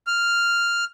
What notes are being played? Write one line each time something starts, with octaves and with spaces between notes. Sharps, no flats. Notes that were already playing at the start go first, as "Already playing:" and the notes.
F6